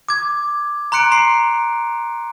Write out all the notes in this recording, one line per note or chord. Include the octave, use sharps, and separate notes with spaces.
D6 G#6
A#5 C6 F#6 C#7 D7
A#5 C6 C7